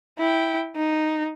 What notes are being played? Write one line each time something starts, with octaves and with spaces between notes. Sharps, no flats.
E4 G5
D#4